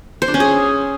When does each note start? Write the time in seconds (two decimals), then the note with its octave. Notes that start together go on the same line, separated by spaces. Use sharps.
0.22 C5
0.28 D4
0.34 C#4
0.40 G#4